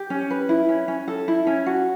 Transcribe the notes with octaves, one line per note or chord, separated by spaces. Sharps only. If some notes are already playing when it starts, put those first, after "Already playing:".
Already playing: G4
C#4
B4
E4
C#4
C#4
A4
E4
C#4
F#4